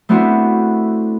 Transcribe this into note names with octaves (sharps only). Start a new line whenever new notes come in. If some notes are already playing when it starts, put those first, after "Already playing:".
A3 B3 C4 D4 E4 F#4